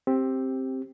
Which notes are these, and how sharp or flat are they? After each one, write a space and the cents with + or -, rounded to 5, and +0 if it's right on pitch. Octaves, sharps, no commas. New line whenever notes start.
C4 +10 G4 +0